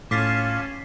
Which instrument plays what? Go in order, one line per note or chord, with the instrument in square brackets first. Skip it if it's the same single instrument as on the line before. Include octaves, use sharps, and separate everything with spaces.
[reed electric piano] A2 A6 [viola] C#4 A5 [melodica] F4 [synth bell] D6 B6 C7